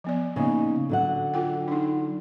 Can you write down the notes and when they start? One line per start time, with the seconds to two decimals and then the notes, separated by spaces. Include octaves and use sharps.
0.04 F3 B3 D5
0.36 C#3 A#3 B3 D#4
0.89 D3 F#3 F#5
1.34 F4 A4 G5
1.68 D4 D#4